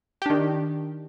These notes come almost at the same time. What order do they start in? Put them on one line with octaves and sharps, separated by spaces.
G4 D4 D#3